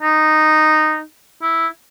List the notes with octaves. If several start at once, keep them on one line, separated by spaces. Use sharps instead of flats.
D#4
E4